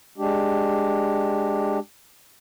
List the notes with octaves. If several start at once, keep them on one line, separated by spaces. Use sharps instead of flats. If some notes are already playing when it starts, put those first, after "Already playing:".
G#3 D4 G4